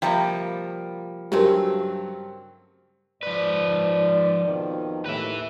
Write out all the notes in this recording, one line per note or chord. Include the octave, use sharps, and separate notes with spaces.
C3 F3 G3 A#3 G5
G2 C#3 F#3 A3 C4 G4 A#4
G#2 F3 B4 D5
F2 B2 D#3
D#2 A2 B4 E5